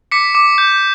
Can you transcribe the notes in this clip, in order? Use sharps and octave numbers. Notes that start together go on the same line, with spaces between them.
D6 B6 C#7
D6
G6